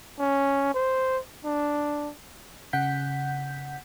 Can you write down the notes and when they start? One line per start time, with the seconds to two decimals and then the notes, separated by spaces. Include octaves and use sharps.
0.19 C#4
0.74 C5
1.45 D4
2.73 C#3 F#5 G6 B6